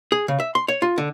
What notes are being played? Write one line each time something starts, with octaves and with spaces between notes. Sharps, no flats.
G#4
C#3
E5
C6
C#5
F4
D3